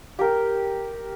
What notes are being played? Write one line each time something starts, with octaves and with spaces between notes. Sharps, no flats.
G4 A#4